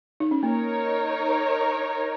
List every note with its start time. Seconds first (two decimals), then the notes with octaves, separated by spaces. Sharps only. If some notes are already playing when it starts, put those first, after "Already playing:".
0.20 D#4
0.31 C#4
0.43 A#3 D#4 A#4 C#5